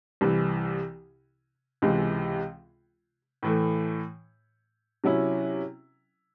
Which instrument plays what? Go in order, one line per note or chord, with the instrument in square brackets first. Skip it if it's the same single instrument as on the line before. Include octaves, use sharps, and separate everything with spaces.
[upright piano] C2 C3 E3
C#2 C3 E3 G#3
A2 E3 A3
C3 F#3 C#4 E4